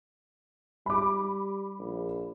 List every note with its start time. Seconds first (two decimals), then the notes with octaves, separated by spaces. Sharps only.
0.86 G3 B5 D6
1.79 A#1